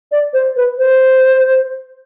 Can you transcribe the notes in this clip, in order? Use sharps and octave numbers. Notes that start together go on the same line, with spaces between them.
D5
C5
B4
C5